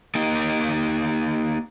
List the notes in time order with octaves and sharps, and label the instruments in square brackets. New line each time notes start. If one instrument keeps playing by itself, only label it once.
[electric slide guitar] A#3 D#4 G4 A#4